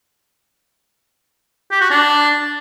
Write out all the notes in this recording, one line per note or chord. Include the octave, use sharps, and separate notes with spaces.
G4
F#4
D4